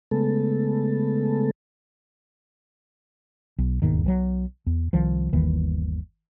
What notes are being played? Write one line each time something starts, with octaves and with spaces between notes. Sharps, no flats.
C#3 G#3 A3 B3 A4
B1
E1 D#2 G#2 D#3
B1 E3 F#3
E2
C2 D#3 F3
G1 D#2 D#3 E3